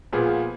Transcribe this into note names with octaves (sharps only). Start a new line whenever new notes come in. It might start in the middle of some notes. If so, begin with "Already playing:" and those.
A#2 F3 B3 F4 G#4